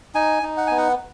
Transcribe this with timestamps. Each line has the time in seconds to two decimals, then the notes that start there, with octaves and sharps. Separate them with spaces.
0.15 D#4 G#5
0.43 D#4
0.57 F#5
0.67 B3 G#5
0.78 F#5